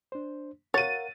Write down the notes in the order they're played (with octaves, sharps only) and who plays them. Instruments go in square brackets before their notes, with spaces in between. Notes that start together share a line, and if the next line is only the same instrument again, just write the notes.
[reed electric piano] D4 C5
[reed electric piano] A#4 F5 F#5 [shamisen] C#5 [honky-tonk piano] A6 D#7